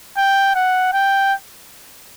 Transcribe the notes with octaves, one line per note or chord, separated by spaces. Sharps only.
G5
F#5
G5